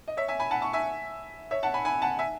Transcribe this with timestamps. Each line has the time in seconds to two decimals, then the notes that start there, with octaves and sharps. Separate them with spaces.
0.08 D#5
0.17 C#5 E5
0.28 E5 G#5
0.39 G#5 B5
0.51 F#5 A5
0.62 A5 C#6
0.73 E5 G#5
1.51 C#5 E5
1.63 F#5 A5
1.74 G#5 B5
1.85 G#5 B5
2.02 F#5 A5
2.19 E5 G#5